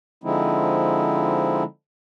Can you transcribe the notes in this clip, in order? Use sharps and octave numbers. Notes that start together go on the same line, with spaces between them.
D3 F3 G#3 C4 D#4 E4